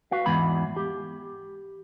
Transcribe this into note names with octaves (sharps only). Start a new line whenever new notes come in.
F#4 B4 F5
E2 G#2 B5
G4